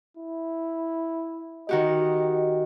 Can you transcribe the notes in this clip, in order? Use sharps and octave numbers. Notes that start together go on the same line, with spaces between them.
E4
D#3 F#4 G4 D#5